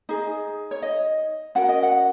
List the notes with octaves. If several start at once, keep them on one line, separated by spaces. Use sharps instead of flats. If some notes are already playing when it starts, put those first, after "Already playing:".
D#4 G#4 D#5
C#5
D#5
C#4 F#4 A#4 F#5
D#5
F#5